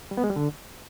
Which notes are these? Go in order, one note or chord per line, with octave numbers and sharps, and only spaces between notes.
G3
B3
G#3
G3
D3